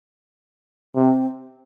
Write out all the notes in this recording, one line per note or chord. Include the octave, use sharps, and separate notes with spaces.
C3 C4